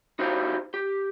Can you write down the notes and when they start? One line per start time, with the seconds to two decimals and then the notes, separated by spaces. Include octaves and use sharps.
0.19 D#4 E4 F#4 G4 C5 F5
0.74 G4